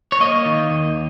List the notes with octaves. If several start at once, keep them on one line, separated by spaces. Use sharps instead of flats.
C#5
A#3 D#5
D#3
D#2